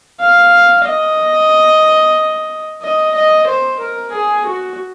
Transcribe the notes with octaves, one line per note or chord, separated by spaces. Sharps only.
F5
D#5
D#5
D#5
C5
A#4
G#4
F#4